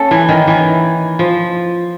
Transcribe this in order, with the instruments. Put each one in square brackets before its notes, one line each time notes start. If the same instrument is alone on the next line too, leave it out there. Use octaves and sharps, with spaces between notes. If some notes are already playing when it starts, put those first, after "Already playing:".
Already playing: [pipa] A#3 C#4 A4
[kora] E3
D#3
E3
F3